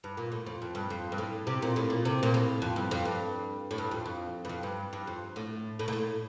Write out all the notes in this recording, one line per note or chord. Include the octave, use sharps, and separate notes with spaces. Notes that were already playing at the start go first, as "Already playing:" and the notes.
G2
A#2
A2
F2
F2
G2
F2
G2
A2
C3
A#2
A2
A#2
C3
A#2
A2
F2
G2
F2
G2
A2
G2
F2
F2
G2
F2
G2
G2
F2
A2
A2
A#2
A2